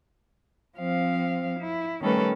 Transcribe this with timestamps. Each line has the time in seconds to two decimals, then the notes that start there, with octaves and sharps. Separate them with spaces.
0.77 F3 C4 F5
1.59 E4
2.01 D#3 G3 A3 C#4 A4 B4